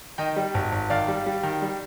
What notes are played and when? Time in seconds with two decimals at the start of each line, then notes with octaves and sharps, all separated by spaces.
0.18 D#3 D#5 G5
0.36 G3
0.54 G#1
0.72 G#1
0.90 D#3 D5 F5
1.08 G3
1.26 G3
1.43 D#3
1.62 G3